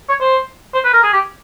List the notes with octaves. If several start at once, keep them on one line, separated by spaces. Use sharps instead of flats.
C#5
C5
C5
B4
A#4
G#4
G4